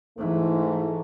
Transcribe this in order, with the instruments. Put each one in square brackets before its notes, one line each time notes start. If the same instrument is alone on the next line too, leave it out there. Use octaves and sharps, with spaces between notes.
[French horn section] G#2 A3 [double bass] E3